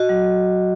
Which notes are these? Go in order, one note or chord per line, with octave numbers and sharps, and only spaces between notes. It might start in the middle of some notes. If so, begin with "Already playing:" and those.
Already playing: F#4 D#5
F#3